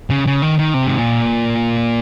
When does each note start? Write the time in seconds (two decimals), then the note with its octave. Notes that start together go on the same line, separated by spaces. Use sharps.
0.10 C#3
0.26 C#3
0.42 D#3
0.58 D#3
0.74 C3
0.87 G#2
0.98 A#2